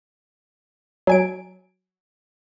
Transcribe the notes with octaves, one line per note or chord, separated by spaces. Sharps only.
F#3 G#5 D7